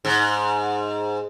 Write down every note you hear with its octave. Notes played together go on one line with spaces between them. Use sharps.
G#2